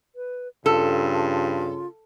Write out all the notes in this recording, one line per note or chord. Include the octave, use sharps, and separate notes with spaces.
B4
G2 C#3 F4 A4